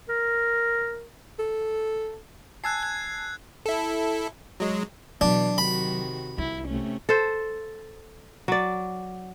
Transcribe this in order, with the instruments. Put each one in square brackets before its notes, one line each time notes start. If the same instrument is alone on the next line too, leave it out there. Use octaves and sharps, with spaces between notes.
[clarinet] A#4
[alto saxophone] A4
[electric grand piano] G#5 A5 E6 [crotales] F#6 G#6 C7
[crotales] F#6 G#6
[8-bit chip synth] E4 A4
F#3 G#3
[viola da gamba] B2 E3 [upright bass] F#3 [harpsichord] D4
[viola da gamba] C3 D#3 F#4 [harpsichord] B5
[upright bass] C2 [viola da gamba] E4
[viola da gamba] C3 A3 C#4
[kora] A4 C5
F#3 D5